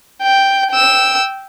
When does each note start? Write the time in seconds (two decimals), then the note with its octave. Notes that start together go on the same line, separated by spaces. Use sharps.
0.22 G5
0.70 G5 E6